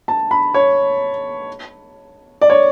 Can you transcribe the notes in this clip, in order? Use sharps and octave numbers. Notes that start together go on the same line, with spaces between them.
A5
B5
C#5
D5
C#5